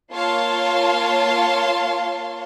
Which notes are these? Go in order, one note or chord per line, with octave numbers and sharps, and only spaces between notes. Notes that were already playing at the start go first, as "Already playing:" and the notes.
A#3 F4 C#5 F5 A5 C6